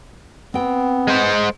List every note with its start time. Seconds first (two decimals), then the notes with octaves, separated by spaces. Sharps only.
0.54 B3 C4 G5
1.08 G#3 C5